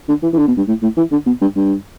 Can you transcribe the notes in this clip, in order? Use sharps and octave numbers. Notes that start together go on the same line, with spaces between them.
D3
E3
E3
D3
B2
G2
A2
A2
E3
D3
B2
G2
G2